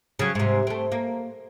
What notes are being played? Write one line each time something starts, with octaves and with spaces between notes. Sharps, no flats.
C#3 F#3
G#2 C3
A3 C4
A#3